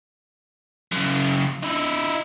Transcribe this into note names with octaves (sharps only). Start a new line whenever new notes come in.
F#2 C#3
D#4 E4